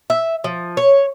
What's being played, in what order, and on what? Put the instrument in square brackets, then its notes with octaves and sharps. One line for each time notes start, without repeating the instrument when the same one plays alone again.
[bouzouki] E5
F3
C#5